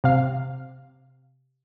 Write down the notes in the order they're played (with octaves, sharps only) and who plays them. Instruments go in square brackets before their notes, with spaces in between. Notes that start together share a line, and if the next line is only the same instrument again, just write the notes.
[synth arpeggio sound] C3 F5